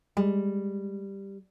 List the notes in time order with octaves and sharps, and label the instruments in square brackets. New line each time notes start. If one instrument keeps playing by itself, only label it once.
[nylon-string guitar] G3 [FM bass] G#3